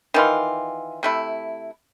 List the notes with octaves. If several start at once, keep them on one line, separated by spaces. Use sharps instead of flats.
D#3 E3 F4
C3 A3 E4